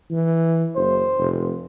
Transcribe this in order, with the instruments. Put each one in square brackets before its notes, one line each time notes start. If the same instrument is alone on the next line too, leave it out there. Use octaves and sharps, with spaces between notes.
[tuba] E3
[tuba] F#1 [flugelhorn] C5
[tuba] F1